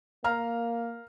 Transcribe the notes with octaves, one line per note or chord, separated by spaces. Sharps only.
A#3 F5 A#5 F6